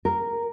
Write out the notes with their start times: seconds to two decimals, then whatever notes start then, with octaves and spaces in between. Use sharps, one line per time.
0.05 A#4